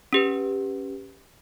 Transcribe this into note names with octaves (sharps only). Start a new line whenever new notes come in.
C#4 G4 B4